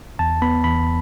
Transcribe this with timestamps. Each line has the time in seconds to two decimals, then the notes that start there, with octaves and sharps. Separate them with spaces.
0.19 E2 A5
0.42 B3 B5
0.64 E2 B5